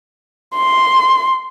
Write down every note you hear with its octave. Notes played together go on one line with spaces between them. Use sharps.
C6